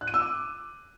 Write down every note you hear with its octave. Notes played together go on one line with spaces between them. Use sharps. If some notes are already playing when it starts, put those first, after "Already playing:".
F#6
D#7
E6
D6